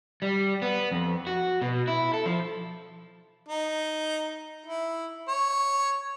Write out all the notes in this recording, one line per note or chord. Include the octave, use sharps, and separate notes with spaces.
G3
B3
F2
F#4
B2
E4
A4
F3
D#4
E4
C#5